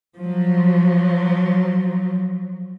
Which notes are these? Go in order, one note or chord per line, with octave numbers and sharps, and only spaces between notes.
F3 F#3